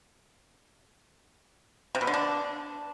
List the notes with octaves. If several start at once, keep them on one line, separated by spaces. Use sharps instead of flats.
C3
B2
D3
D4